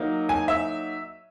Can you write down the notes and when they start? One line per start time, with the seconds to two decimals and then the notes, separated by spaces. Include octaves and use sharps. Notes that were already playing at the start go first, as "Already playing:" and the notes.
Already playing: F#3 A#3 D#4
0.29 G#5
0.48 E5